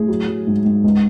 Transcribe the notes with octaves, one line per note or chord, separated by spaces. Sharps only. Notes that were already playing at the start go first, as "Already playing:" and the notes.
Already playing: A2 G#4
F#3
F#3
G#2
G#2
C#2